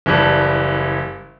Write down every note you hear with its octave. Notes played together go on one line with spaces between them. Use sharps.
F#1 E3 G3 A5